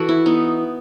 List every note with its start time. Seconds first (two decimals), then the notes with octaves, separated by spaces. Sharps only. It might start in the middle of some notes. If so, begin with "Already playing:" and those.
Already playing: E3 F#4 A4 B4
0.09 E4
0.26 B3 D#4